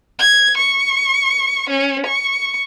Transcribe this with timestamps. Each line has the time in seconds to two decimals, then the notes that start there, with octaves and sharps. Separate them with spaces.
0.19 G#6
0.57 C#6
1.70 C#4
2.06 C#6